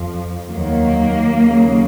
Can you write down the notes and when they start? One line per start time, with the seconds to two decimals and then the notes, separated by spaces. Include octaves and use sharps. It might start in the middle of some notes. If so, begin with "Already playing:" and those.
Already playing: F2 F3
0.48 D#2 D#3 F#3 A#3
1.39 D#2 C#3 F#3